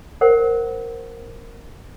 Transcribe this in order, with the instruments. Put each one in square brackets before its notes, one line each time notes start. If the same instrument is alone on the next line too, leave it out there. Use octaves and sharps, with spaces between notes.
[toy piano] A#4 C5 F#5